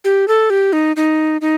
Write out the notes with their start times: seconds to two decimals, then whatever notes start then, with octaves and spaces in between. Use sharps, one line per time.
0.04 G4
0.28 A4
0.50 G4
0.73 D#4
0.96 D#4
1.41 D#4